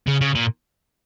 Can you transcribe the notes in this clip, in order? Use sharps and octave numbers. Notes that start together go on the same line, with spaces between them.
C#3
C#3
A#2